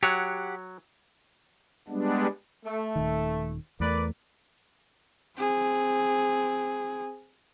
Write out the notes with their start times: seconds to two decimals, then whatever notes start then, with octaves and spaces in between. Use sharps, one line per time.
0.03 F#3 G4 C#5 F#5
1.88 G3 G#3 B3 D4
2.65 A3
2.96 D#1 D#3
3.80 E2 A3 A#4 B4 D5
5.38 C4 G#4